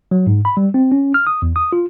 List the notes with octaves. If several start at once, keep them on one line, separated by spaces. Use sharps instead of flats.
F#3
G#2
B5
G3
C4
C#4
F6
D#6
E2
D#6
F4